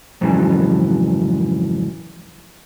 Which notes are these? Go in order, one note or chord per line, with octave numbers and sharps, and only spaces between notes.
F2 G#2 C#3 E3 F#3